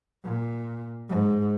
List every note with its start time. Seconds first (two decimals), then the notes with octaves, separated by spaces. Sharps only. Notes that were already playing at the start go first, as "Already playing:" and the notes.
0.25 A#2
1.09 G#2